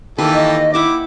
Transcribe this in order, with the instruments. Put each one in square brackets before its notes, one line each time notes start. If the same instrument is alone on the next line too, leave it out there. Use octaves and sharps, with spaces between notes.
[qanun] D#3 A#3 B4 [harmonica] E3 G4 A4
[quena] D#5
[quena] E4 [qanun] G4 E5 F#5 [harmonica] D6